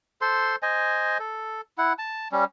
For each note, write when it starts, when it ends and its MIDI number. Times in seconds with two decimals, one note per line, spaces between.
0.21 0.56 69
0.21 0.56 72
0.21 0.56 84
0.63 1.18 72
0.63 1.18 75
0.63 1.18 80
1.19 1.61 69
1.78 1.93 64
1.78 1.93 78
1.98 2.28 81
2.32 2.44 55
2.32 2.44 61